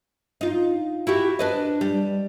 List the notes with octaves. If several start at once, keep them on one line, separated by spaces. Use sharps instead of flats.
D#4 F4
E4 F#4 G4
D4 B4 D#5
G3